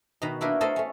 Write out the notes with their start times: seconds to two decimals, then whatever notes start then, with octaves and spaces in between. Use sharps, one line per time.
0.22 B2 D#3 B4 A#5
0.41 A#3 D4 E4 F#4 A#4 B4
0.61 A3 A4 A#4 C5 D#5 A5
0.76 A3 C#4